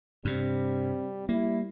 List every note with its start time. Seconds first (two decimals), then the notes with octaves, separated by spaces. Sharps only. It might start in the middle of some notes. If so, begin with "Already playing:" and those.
0.25 G2 C3 G3 C4
1.29 G3 A#3 E4